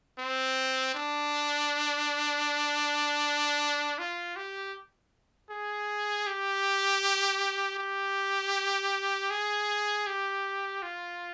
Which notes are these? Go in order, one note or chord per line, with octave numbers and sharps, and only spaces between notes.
C4
D4
F4
G4
G#4
G4
G4
G#4
G4
F4